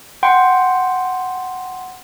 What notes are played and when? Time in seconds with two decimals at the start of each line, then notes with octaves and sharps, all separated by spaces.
0.23 F#5 G5 C6